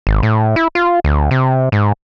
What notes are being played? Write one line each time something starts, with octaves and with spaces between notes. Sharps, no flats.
G#1
A2
E4
F4
D2
C3
G#2